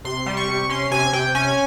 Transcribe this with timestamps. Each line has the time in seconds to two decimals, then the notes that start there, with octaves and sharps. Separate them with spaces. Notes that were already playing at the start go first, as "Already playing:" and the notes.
0.05 C3 C6
0.26 G3
0.37 C#6
0.48 C3
0.69 C#4 C6
0.91 C3 G#5
1.13 C3 G5
1.35 C#4 G#5